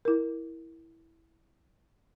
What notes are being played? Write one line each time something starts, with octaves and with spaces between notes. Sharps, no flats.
E4 A#4